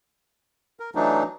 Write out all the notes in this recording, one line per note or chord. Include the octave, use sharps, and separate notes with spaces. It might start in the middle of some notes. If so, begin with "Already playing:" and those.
A#4
E3 F#3 A3 D4 D#4